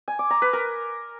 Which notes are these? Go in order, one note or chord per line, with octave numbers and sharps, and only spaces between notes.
G#5
D6
A#5
B4
A#4